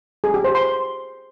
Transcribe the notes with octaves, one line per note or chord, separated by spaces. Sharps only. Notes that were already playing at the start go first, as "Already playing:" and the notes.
G#4
G4
C5
C6